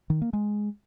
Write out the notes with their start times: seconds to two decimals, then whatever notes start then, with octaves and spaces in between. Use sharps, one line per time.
0.10 D#3
0.22 A#3
0.33 G#3